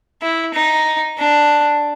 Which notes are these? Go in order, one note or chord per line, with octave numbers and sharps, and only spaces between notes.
E4
D#4
D4